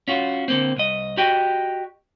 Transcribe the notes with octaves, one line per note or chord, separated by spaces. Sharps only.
C#4 F4 F#4
D3 A#3 C4
C2 D#5
F#4 G4 D#5 G5